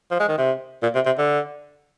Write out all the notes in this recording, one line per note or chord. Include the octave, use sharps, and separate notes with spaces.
F3
G#3
D#3
C3
A#2
C3
C3
D3